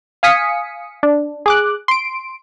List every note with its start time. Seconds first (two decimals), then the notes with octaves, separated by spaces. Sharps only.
0.23 F5 G#5 D#6 B6 C#7
1.03 D4
1.46 G#4 D6 F#6
1.88 C6 D7